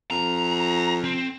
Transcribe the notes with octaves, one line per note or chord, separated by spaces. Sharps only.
F2 A#5
C4